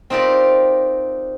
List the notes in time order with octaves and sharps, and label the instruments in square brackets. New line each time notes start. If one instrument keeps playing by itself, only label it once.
[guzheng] C4 D#4 F4 G4 A#4 D5